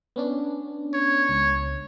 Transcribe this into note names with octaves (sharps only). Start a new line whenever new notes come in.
B3 C#4 D4
C#5
C#2